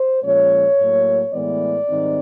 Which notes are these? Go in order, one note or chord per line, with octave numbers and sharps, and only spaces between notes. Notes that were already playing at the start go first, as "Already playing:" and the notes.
Already playing: C5
A#2 F3 G#3 C#4 C#5
A2 F#3 A#3
A2 E3 G#3 B3 D5
G#2 D#3 G3 C4 D#4